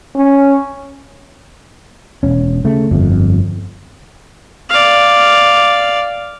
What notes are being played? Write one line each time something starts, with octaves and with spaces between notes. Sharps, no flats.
C#4
E1 C#4
C#3 A3
G1 F2
D5 F5